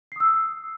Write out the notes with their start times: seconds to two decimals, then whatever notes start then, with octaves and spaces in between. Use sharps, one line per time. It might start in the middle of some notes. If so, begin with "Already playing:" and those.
0.12 C7
0.16 D#6
0.20 E6